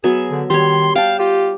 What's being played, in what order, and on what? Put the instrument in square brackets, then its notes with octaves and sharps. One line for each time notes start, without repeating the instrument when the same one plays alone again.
[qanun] F#3 B3 E5 [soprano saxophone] G#4
[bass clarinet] D3
[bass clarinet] D#3 [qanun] G3 C#5 [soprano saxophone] C6
[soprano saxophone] F5 [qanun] G5 A5
[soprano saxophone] F4 [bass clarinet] G4